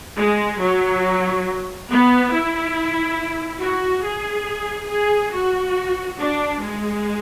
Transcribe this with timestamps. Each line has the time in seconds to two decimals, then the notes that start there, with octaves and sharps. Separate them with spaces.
0.17 G#3
0.60 F#3
1.89 B3
2.32 E4
3.60 F#4
4.03 G#4
4.89 G#4
5.33 F#4
6.18 D4
6.61 G#3